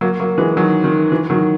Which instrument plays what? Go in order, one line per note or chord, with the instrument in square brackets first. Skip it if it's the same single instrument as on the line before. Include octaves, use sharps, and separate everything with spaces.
[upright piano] F#3 A#3
F#3 A#3
E3 G#3
D#3 F#3
D#3
E3
D#3 F#3